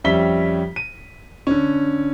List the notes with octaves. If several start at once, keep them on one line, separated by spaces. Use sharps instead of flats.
F2 G3 C#4 E5 B6 G7
D#7
D3 C#4